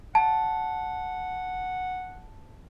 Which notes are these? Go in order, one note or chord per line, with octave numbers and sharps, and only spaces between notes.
F#5 A5